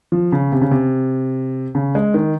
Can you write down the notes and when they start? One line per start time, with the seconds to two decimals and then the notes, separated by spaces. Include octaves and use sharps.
0.12 F3
0.32 C#3
0.52 C3
0.61 C#3
0.71 C3
1.75 C#3
1.95 G#3
2.14 D#3